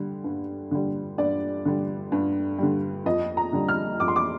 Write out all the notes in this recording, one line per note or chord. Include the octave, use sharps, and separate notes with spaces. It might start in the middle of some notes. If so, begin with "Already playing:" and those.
Already playing: D3 G3
G2
D3 G3
G2 D5
D3 G3
G2
D3 G3
F2 D#5
A#5
D3 G3
F6
F2 D6
C6
D6